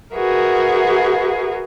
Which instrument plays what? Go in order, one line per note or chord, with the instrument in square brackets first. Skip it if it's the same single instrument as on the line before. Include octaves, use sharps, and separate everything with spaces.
[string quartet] F#4 G#4 A#4 B4 E5